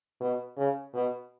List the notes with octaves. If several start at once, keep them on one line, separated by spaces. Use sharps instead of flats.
B2
C#3
B2